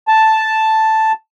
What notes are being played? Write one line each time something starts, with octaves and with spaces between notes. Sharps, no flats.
A5